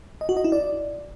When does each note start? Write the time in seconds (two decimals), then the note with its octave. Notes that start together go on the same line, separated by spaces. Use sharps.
0.21 D#5
0.29 F#4
0.37 D#5
0.44 E4
0.52 D5